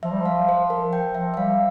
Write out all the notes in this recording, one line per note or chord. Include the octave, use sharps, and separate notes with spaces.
F3 E5
G3
F3 F5
C5
A#4
G5
F3 E5
E5
G3 F5